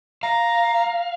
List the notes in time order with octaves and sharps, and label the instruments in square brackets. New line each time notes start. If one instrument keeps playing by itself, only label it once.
[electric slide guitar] F5 [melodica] A#5